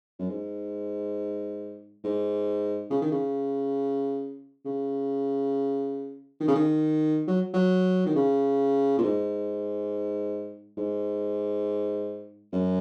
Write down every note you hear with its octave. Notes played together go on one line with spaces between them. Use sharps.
F#2
G#2
G#2
C#3
D#3
C#3
C#3
D#3
C#3
D#3
F#3
F#3
D#3
C#3
A#2
G#2
G#2
F#2